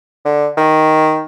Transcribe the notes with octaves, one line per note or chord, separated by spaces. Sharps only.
D3
D#3